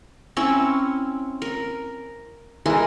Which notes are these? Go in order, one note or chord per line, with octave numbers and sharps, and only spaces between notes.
C4 C#4 E4 C#5
A#4
E3 G#3 A#4